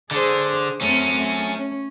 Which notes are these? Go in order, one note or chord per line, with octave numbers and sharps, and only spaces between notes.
D3 G#4 C5
F#3 A3 C4 C#4
A3
C#4